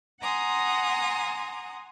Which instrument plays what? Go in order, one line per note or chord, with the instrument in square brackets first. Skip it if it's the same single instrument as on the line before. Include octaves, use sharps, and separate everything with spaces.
[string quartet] F#5 G#5 A#5 C6 D#6